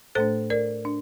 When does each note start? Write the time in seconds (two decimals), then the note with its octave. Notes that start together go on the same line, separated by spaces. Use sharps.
0.15 A2 A3 D4 A4 C5
0.50 A#4 D5
0.85 D4